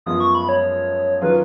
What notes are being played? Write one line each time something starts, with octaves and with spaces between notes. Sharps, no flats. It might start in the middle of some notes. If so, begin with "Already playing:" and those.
F#2 F3 G#3 B3 F4 D#6
C#6
B5
C#5
D#3 F#3 C#4 F4 G#4 B4